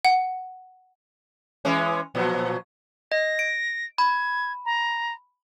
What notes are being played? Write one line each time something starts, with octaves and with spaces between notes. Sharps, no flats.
F#5
E3 G#3 C#4
A#2 F3 F#3
D#5 A#6
D7
B5 G#6
A#5